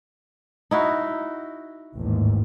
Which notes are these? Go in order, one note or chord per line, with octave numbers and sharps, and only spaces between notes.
D#4 E4 F#4
A1 D#2 G#2